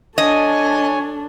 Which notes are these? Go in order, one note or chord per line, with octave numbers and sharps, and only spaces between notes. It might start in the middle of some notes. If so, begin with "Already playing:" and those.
D4 A4 C#5 D#5 G#5